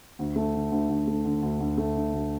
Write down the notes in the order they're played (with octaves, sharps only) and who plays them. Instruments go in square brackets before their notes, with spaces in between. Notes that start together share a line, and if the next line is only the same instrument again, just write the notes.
[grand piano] D2
A3
D3
D2
D2
A3
D3
D2
D2
A3
D3
D2